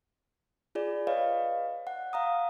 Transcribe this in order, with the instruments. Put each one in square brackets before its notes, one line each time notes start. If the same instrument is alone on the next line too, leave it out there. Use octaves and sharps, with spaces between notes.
[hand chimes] F4 G#4 D5
B4 C#5 D#5 F5
F#5
F5 A#5 D#6